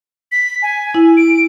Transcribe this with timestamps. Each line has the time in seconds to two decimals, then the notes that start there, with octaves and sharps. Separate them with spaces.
0.32 B6
0.62 G#5
0.95 E4
1.17 D7